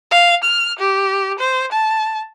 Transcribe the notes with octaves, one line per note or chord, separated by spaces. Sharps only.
F5
F6
G4
C5
A5